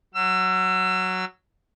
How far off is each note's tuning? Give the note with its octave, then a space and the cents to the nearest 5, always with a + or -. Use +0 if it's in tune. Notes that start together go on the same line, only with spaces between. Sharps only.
F#3 +0 E6 +30